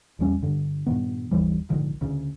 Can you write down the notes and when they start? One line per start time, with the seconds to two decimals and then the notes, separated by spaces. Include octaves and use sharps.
0.19 A#1 E2 G3 C#4
0.42 G2 D3
0.86 G2 A#2 D#3 B3
1.31 G1 D#2 E3 G3
1.70 A#1 G#2 D3 D#3
2.01 D2 C#3